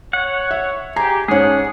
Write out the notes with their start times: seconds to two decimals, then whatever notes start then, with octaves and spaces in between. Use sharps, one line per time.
0.13 C#5 F#5
0.51 E5
0.96 G4 G#4 A#5
1.28 G#2 C#4 D4 F4 G#4 F#5